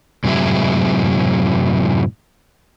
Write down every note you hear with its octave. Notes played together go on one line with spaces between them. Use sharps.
F#2 A2 C3 F#3 G#3 E4